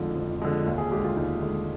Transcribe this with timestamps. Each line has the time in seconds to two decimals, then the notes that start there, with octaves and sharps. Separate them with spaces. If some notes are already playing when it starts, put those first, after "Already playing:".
Already playing: F2 D3 F3 G#3 D#4 F4
0.16 F2
0.42 D3 F3 G#3
0.66 D#2
0.78 G#4
0.91 D3 G#3 G4
1.04 F4
1.17 D#2 D#4
1.42 D3 G#3